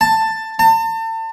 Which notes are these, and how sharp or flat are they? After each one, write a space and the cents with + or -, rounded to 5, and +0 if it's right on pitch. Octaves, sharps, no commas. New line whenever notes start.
A5 +10
A5 +35